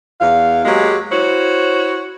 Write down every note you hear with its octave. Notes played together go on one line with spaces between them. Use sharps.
E2 F5
F#3 G#3 A#3 G4 G#4
E4 F#4 C5 C#5